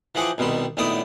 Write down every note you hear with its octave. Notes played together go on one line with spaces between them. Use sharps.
E3 F3 G#4 F#5 G5 D6
C2 B2 D#3 G3 C6
A#1 A2 D#3 B3 D5 D#6